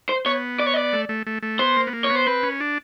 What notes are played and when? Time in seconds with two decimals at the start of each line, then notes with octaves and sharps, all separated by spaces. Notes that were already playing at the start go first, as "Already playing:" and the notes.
0.09 C5
0.26 B3 C#5
0.59 D5
0.66 C#5
0.74 D5
0.93 A3
1.09 A3
1.27 A3
1.42 A3
1.59 B3 C5
1.77 A#3
1.87 B3
1.93 A#3
2.04 C#5
2.10 B3
2.16 C5
2.27 C4 B4
2.43 C#4
2.60 D4